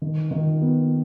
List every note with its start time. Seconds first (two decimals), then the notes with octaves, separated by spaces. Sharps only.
0.02 D#3
0.31 D#3
0.61 B3